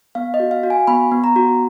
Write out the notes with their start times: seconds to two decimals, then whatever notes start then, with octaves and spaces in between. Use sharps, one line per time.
0.15 B3 F5
0.34 D#5
0.40 F#4
0.51 F5
0.63 F#4
0.70 G#5
0.87 B3 B5
1.12 B3
1.24 A#5
1.36 F#4